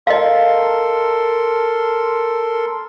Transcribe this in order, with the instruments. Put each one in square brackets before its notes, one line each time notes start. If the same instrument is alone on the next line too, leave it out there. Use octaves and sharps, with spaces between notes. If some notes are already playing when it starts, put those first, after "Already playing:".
[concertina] A4 A#4 C6 [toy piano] D#5 F5